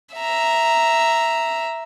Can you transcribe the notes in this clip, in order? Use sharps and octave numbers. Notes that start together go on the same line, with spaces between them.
E5 A#5